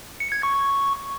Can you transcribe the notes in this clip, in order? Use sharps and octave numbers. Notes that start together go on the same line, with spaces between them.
C#7
G#6
C#6